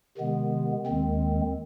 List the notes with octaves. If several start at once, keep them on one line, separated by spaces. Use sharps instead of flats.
C3 D#3 G#3 B3
D#2 D#3 G#3 C4